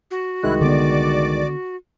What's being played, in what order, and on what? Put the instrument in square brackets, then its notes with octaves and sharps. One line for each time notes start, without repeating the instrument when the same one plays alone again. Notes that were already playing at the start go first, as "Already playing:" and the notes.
[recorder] F#4
[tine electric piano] C2 D#3 G#3 [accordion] E4 F#6
[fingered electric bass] D3 B3 [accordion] D5 D6